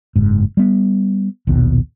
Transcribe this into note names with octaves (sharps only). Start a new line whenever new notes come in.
F#1 G#2
G3 B3
A#1 D#2 B2